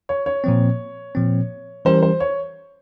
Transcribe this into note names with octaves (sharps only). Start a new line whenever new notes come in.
C#5
C#5
A#2 F3 C4
A#2 F3 C4
E3 G3 C#4 G4 A#4 C5
C5
C#5